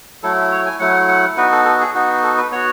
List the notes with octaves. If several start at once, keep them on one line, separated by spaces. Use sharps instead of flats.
F#3 A3 E4 A4
C#5
G#5
F#3 A3 E4 F#5
F#5
B3 D#4 F#4 B4
A4
A4
G#4
B3 D#4 F#4
A4
B4
B3 F#4 C#5